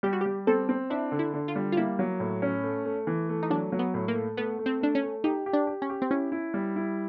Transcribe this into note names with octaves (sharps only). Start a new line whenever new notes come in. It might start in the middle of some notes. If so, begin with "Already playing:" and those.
G3 G4
F#4
G3 G4
C4 A4
C4
D4 E4
D3
E4
D3
F4
G3
F4
A#3 E4
F#3
A2
C#4
A3
A3
E3
A3
D#4
F#3 D4
F#3
B3
A2
A#3
A3
A3 B3
A3
C4
A3 D4
C#4
A3
D#4 G4
G4
D4
G4
C#4
G4
C4
C#4 E4
E4
G3
E4